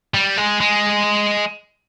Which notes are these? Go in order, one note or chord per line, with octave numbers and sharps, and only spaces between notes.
G3
G#3
G#3